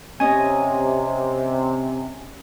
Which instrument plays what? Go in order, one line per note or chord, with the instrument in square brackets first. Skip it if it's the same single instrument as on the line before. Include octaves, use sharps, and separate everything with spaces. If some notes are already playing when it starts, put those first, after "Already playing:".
[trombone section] C3 [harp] C#4 D#5 [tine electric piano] G#5